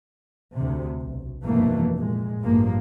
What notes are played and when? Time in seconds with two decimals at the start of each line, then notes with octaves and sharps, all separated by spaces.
0.54 D2 C3
1.01 B1
1.44 F1 G2 B2 E3 A3 A#3
1.97 A#2 G#3
2.42 A1 G2 F3 A#3